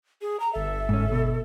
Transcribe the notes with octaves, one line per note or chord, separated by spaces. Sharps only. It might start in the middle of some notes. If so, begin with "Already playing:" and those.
G#4
A#5
G1 A4 E5
G#2 C#4
B2